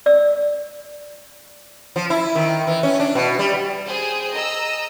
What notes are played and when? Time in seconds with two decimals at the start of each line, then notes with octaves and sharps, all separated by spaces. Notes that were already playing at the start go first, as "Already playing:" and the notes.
0.06 D5 E6
1.96 F3
2.10 E4
2.35 D#3
2.67 E3
2.83 C#4
2.99 D4
3.15 B2
3.39 G3
3.86 G#4 C5 G5
4.33 D#5 A#5 E6